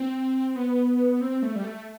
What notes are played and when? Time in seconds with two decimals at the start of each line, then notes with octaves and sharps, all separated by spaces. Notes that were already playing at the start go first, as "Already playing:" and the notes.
Already playing: C4
0.56 B3
1.21 C4
1.42 A3
1.56 G3
1.64 A3